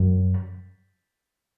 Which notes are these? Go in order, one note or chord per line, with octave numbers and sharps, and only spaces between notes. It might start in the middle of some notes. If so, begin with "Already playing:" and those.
Already playing: F#2